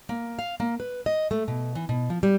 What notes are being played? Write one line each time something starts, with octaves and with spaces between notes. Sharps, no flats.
A#3
F5
A#3
B4
D#5
A3
B2
E3
B2
F3
G3